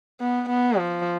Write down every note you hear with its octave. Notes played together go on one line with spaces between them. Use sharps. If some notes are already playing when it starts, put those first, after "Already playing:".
B3
B3
F3